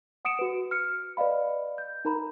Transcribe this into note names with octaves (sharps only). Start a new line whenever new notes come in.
F#5 D#6 C#7 D7 E7
F#4 B4
F6 C#7
B4 D5 D#5 F5 B5
G6
D#4 A#4 A#5 B5